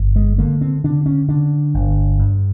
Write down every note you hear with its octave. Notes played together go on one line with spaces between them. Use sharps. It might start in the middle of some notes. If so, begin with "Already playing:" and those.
Already playing: G1
G#3
D3 A#3
C4
D3 D4
C#4
D3 D4
G1
G2